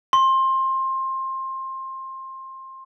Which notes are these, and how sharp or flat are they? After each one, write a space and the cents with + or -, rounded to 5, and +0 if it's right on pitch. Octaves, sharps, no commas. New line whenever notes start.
C6 +20